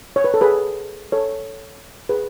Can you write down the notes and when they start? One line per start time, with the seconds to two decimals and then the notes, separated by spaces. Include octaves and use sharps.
0.16 C#5
0.24 B4
0.34 A4
0.41 G#4 B4
1.12 A4 C#5
2.09 G#4 B4